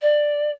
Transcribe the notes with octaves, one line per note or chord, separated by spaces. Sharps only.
D5